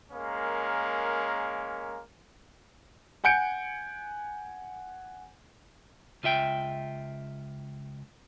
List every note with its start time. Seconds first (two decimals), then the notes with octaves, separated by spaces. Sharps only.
0.12 G#3 A#3 C#4 A#4 F5
3.24 F#5 G#5 G6 C#7 D7
6.23 C#2 F4 E5 G5